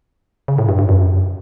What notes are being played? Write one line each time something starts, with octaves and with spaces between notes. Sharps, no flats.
C#3
A2
G2
G2
F#2